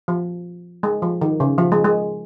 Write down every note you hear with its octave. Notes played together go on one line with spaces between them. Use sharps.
F3
G#3
F3
D#3
C#3
F3
G#3
G#3